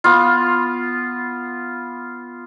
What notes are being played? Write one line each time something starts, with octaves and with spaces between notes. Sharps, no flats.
B3 F4